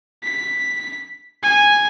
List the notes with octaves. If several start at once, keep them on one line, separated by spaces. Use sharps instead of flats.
B6
G#5